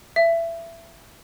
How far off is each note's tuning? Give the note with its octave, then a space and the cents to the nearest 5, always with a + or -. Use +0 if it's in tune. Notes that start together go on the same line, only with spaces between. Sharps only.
E5 +25